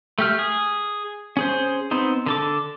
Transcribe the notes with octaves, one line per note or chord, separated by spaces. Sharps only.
A3 G4 F6
G#4
C#4 G#4 C5
B3 C4 D#4
D3 A4 D6